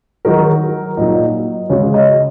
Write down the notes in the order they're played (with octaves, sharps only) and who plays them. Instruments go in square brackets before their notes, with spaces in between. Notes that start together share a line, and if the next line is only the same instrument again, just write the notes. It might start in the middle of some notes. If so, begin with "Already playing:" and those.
[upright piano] D#3 F#3 D#4 F#4 [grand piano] A#4
[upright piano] A#2 F#3 D#4 [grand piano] D#5
[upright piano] C#3 G#3 C#4 F#4 [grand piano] C#5
[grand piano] D#5